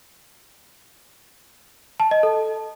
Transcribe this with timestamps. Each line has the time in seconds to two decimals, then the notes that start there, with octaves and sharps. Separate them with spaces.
2.00 A5
2.11 D#5
2.23 A4